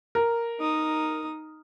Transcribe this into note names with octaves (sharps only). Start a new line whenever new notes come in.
A#4
D#4 D#6